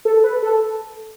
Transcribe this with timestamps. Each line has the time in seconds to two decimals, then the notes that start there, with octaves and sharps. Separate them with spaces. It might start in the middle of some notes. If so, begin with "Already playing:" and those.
0.05 A4
0.24 B4
0.43 A4